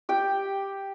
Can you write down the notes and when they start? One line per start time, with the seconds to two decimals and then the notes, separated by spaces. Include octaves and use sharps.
0.09 G4 G5